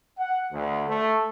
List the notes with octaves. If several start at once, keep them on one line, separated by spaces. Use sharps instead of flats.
F#5
D2
A3